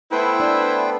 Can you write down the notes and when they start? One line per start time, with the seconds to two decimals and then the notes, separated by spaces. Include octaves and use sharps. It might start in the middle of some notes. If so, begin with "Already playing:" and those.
0.12 A3 B3 E4 B4 C5 G5
0.40 D4